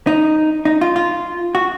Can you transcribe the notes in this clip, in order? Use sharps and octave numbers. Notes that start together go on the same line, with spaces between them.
D#4
D#4
F4
F4
F#4